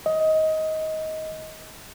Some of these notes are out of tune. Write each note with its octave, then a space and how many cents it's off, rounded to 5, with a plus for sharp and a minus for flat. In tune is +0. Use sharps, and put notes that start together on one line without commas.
D#5 +15